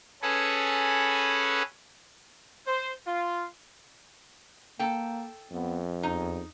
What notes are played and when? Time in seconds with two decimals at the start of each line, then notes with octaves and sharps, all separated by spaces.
0.22 C#4 G#4 A4 B4 F#5 G#5
2.67 C5
3.07 F4
4.79 A#3 A4 G5
5.51 F2 B3
6.03 E2 D#4